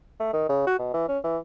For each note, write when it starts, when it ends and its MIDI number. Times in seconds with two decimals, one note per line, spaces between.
0.20 0.28 57
0.33 0.47 51
0.49 0.66 49
0.67 0.76 66
0.79 0.90 47
0.93 1.07 52
1.08 1.18 61
1.24 1.38 52